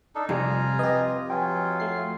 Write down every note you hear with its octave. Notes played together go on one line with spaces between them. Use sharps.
D4 D#4 A4
F2 C3 F3 G3 F4 G#5 A#5
G4 B4 D#5
F#3 F4 G5 G#5
A3 C7